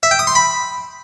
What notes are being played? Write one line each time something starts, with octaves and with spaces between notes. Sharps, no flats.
E5
G5
D#6
C6
B5